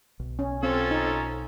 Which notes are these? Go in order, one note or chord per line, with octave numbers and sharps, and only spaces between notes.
B1
C#4
C4 C#4 F4 A4
D#4